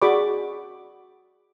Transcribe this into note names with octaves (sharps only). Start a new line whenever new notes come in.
F#4 G#4 D5 B5 C#6 D6